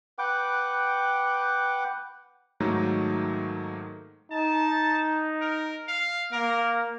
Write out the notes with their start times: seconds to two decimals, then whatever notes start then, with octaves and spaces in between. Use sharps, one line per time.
0.19 B4 F#5 G5 D6
2.60 G#2 D#3 F#3 A3 A#3 D#4
4.32 D#4 A5
5.41 A#4
5.88 F5
6.33 A#3 A#4